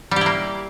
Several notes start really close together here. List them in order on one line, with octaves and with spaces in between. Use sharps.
G3 G4 E4 A#3